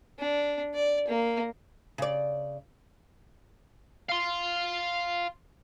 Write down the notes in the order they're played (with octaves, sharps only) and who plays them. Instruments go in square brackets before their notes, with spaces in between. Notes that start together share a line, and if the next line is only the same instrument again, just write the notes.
[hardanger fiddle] D4
D5
A#3
[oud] C#3 D5
[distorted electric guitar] F5 C6